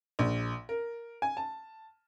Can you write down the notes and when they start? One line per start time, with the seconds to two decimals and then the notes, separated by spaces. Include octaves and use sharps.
0.19 A#1
0.69 A#4
1.22 G#5
1.37 A5